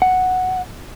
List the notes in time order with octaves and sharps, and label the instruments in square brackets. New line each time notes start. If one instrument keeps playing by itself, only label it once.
[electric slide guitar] F#5